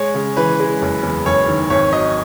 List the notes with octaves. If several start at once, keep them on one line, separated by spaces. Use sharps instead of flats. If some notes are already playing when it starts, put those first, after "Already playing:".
Already playing: G#3 C#5
C#3
E3 B4
G#3
F#1
E2
F#1 C#5
D#3
G#1 C#5
F#3 D#5